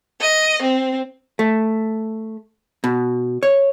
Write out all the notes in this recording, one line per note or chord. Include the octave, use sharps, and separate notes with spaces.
D#5
C4
A3
B2
C#5